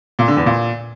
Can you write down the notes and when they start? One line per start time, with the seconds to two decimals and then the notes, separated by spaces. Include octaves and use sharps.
0.19 A#2
0.28 D3
0.37 E2
0.46 A#2